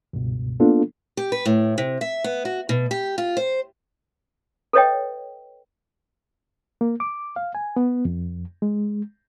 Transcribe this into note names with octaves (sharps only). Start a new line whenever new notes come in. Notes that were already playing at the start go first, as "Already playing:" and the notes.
C#2 G2 B2
A#3 B3 D4 F4 A4
G4
B4
A2
C3
E5
B3
F#4
B2
G4
F4
C5
A4 B4 C#5 D#5 G5
A#3
D6
F5
G#5
B3
F2
G#3